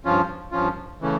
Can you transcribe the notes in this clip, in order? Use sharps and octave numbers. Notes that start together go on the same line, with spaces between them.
G2 F3 C#4 F4
G2 F3 C#4 F4
C#3 E3 A3 C#4